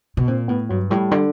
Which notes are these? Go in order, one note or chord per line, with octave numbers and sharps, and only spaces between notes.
B2
A#2 C4
A2 B3
G2 F#3
A2 G3
D3